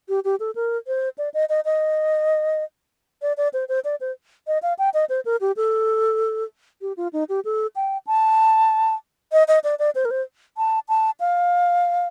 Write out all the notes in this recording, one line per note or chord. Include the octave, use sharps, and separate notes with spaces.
G4
G4
A4
A#4
C5
D5
D#5
D#5
D#5
D5
D5
C5
C5
D5
C5
D#5
F5
G5
D#5
C5
A#4
G4
A4
G4
F4
D#4
G4
A4
G5
A5
D#5
D#5
D5
D5
C5
A#4
C5
A5
A5
F5